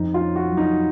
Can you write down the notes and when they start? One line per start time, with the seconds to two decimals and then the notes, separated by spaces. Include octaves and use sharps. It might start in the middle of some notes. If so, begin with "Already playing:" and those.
Already playing: F2 D#4
0.14 F4
0.21 C#4
0.36 F#4
0.50 F#3
0.57 D#4